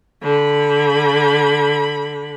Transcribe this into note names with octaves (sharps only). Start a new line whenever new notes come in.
D3 B5